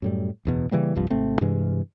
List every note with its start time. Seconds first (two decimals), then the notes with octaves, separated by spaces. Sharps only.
0.02 F#2 A2 G3
0.45 D1 E2 B2
0.71 C#3 E3 G3 A#3
0.95 F1 C2 G2 F3
1.10 G#1 C3 A3 C4
1.41 G2 C3 E3 G#3